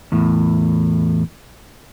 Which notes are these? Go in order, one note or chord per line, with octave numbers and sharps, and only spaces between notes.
E2 A2